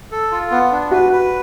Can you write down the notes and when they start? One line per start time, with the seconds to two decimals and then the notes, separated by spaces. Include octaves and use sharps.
0.11 A4
0.32 F4
0.51 B3
0.71 D4
0.91 F#4 B4
1.12 B4